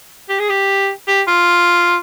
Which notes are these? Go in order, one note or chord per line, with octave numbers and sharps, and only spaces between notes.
G4
G#4
G4
G4
F4